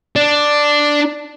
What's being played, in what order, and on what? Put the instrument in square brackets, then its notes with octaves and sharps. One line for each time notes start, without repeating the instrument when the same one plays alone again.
[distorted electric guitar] D4